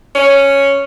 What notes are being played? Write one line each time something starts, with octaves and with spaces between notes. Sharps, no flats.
C#4